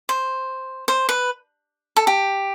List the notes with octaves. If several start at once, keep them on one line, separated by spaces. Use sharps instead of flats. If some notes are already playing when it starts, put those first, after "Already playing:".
C5
C5
B4
A4
G4